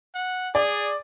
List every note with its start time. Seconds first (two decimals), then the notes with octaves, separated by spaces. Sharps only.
0.15 F#5
0.55 G#4 D5